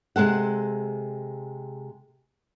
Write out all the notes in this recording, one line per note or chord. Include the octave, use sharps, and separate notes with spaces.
C3 G#3 A4 F#5